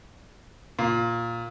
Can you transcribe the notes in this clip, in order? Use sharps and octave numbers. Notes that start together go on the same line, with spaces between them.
A#2